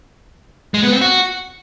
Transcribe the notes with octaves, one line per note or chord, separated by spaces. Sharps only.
G#3
B3
C4
F#4